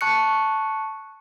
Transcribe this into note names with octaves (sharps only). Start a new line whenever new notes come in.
A5 C#6 F#6 C#7